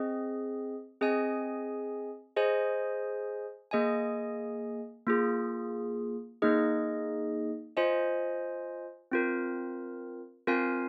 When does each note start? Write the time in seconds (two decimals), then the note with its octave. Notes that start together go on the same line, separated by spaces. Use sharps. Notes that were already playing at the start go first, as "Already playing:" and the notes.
Already playing: C4 G#4 D#5
1.01 C4 G#4 D#5 G#5
2.36 G#4 C5 D#5 G#5
3.71 A#3 G#4 D#5 G#5
5.07 A#3 F4 G#4
6.42 A#3 D#4 G#4 D#5
7.77 F4 C5 D#5 G#5
9.12 C4 F4 A#4
10.47 C4 F4 A#4 F5 G#5